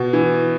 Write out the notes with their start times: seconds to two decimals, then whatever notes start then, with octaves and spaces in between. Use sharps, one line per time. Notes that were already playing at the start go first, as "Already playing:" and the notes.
Already playing: B2
0.13 E3